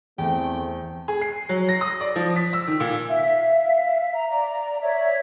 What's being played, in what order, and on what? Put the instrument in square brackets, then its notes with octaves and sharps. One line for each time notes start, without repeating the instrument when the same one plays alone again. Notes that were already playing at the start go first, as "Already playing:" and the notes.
[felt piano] E2 [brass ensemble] A3 C4 [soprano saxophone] G5
[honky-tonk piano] G#4
C7
F#3
A#6
D#6
D5
F3
B6
E6
D#3
A#2
[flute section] E5 F5
A#5
D5 A#5
C#5 D5 E5